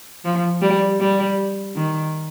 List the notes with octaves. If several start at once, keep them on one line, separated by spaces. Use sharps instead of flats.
F3
G3
G3
D#3